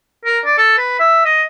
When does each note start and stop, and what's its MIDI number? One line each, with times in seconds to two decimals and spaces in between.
0.25 0.40 70
0.45 0.57 74
0.58 0.76 69
0.78 0.97 71
1.00 1.23 76
1.25 1.43 75